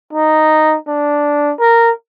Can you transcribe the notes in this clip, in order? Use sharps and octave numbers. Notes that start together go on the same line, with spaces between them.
D#4
D4
A#4